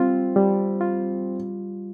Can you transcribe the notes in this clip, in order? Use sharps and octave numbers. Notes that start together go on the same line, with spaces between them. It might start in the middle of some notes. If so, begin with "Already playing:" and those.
Already playing: G3 C4 F4
G3
F4